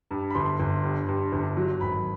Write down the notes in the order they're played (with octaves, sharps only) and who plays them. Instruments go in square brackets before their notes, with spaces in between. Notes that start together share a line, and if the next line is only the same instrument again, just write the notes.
[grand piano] G2
B5
G1 C6
G1
G2
G2
G1
F#3
G#1 B5